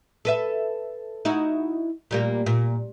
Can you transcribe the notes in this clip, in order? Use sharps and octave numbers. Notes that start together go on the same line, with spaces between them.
A4 B4 E5
D#4 E4 F#4
A#2 G3 A#3
A#2